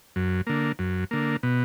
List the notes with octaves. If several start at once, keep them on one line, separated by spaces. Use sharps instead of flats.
F#2
D3 A#3
F#2
D3 A#3
B2